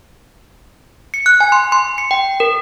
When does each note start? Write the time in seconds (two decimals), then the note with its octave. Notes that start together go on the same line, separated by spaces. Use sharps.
1.14 C#7
1.26 F#6
1.40 G#5
1.52 C6
1.72 C6
1.98 C#7
2.11 G5
2.40 A#4